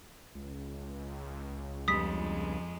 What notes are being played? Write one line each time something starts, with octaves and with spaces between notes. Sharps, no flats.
C#2
F2 G3 G#3 B3 D4 D#6 B6